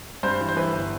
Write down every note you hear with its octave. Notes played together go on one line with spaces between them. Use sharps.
G2 C5
E3
C5
E3 B4
G1